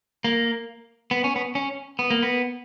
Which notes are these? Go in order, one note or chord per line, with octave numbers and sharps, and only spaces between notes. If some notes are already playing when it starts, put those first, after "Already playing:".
A#3
B3
C#4
B3
C#4
B3
A#3
B3